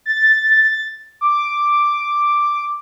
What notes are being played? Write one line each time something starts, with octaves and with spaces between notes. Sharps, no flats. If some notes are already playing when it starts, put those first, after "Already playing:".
A6
D6